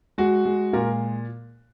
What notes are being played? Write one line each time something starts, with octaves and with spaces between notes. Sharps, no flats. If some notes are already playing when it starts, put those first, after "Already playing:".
G#3 F#4
G#3
A#2 A#4